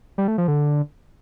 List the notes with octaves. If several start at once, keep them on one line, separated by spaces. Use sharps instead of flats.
G3
A3
F3
D3